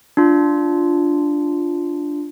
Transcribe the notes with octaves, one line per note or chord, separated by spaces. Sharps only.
D4 F4